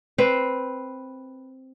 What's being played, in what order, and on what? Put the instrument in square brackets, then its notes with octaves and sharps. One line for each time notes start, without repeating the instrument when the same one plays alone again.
[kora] C4 B4 C5 G5